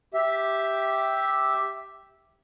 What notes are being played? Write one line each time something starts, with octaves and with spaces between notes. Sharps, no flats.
G4 E5